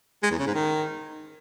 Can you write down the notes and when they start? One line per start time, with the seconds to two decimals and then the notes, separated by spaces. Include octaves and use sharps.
0.23 G#3
0.31 E2
0.39 C#3
0.47 G#2
0.55 D#3